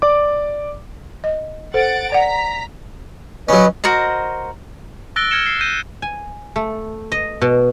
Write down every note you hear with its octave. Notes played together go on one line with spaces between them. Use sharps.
D5 D6
D#5
A4 C5 F#5 A6 D7
D5 F#5 A#5 B6
F#3 C#4 B4 D#5
F#4 A#4 C5 D#5
E6 F#6 A6 A#6 D7 G7
F6 G#6 A#6 C#7 E7 G7
C7
G6 A#6 D#7
G#5
A3
D#5
B2